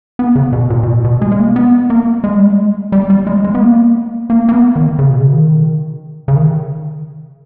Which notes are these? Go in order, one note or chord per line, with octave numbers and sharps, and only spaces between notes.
B3
C#3
B2
A#2
B2
A#2
B2
G#3
G#3
A#3
B3
A#3
G#3
G3
G#3
G3
G3
G#3
G#3
B3
A#3
A#3
A#3
B3
D#3
C#3
B2
C#3
D#3
C#3
D#3